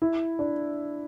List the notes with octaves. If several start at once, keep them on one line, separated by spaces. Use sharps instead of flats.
E4
D4